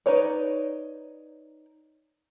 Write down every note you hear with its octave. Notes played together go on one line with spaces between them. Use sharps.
D#4 B4 C#5 D5